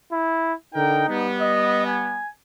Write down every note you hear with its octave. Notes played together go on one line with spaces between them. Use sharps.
E4
D3 D#4 A#4 G5
G3 B3
D#5
G#5